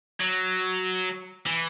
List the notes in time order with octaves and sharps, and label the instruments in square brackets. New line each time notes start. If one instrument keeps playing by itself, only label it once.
[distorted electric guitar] F#3
E3